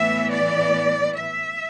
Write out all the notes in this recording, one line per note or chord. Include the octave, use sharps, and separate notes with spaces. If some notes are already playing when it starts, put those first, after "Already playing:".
Already playing: A2 E3 B3 E5
D5
E5